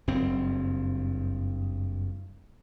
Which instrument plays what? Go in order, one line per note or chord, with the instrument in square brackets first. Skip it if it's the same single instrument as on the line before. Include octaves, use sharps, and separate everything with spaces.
[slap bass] F#1 G2 C4